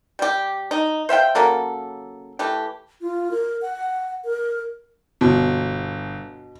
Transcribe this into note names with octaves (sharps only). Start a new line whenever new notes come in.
G3 G4
D#4
C5 E5 F5 G5
C#3 F#3 A#3 A4
E3 A3 G4
F4
A#4
F#5
A#4
G1 B2